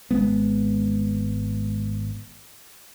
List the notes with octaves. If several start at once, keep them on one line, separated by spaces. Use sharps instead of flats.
G#1 F2 G#3 B3